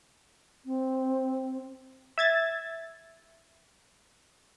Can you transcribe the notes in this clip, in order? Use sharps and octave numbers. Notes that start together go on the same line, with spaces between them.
C4
E5 G#6 A6